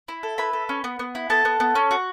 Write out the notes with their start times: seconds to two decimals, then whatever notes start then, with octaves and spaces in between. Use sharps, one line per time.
0.08 E4
0.23 A4
0.38 E4 B4 B5
0.53 A4
0.69 C#4
0.84 B3
0.99 B3
1.15 E4
1.30 B3 A4 A5
1.45 B3
1.60 B3
1.75 C#4
1.91 F#4